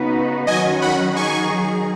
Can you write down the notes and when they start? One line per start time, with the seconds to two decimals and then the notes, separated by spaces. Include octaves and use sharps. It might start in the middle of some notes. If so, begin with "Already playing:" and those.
Already playing: C#3 B3 D#4 F#4 B4
0.47 D#3 F#3 C#4 F#4 D#5 G#5
0.82 F#5 B5
1.16 D#3 F#3 D#4 G#4 G#5 C#6